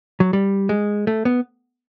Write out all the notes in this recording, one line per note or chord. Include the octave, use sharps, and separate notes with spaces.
F#3
G3
G#3
A3
B3